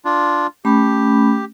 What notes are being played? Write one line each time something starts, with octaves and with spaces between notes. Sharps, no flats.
D4 F4
A3 C#4 G4 B5